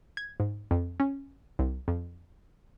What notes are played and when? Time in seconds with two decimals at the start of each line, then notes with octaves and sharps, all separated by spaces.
0.17 G#6
0.40 G#2
0.71 F2
1.00 C#4
1.59 C2
1.88 F2